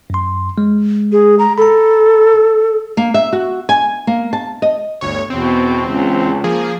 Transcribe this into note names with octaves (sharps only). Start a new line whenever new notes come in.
F#2 C6
G#3
G#4
A#5
A4 A#5 B5
A#3
E5
F#4
G#5
A#3
A5
D#5
G1 D2 C#5
E2 B2 C4
C#2
F3 A#3 G#4